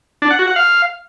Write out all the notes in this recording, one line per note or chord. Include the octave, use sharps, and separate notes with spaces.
D4
F#5
F#4
F#5
F5